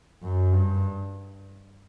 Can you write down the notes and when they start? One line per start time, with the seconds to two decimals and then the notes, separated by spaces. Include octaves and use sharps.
0.23 F#2
0.53 G2